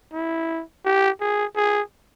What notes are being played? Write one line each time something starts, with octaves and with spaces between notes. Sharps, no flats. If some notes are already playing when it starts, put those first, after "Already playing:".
E4
G4
G#4
G#4